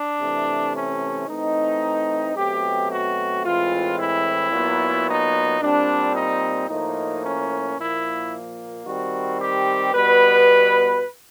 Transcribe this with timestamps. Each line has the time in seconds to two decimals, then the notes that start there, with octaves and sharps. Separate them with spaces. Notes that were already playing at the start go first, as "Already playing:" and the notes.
Already playing: D4
0.20 C3 E3 A3
0.74 C#4
1.27 E3 A3 C4 D#4
2.35 B2 F#3 A3 C4 G4
2.90 F#4
3.44 A2 E3 G#3 C4 F4
3.98 E4
4.52 A#2 F#3 B3
5.07 D#4
5.60 A#2 G3 C4 D4
6.14 D#4
6.68 A2 F3 A#3 D#4
7.22 C#4
7.77 A#2 F3 A#3 E4
8.84 D#3 G3 C4 F#4
9.39 G4
9.93 B2 G3 B3 B4